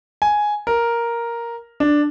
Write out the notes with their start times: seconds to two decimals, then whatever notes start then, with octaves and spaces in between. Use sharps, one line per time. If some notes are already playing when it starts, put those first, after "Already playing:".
0.22 G#5
0.67 A#4
1.80 D4